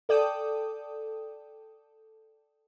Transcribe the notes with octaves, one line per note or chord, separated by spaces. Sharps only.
A4 D5 G5 D#6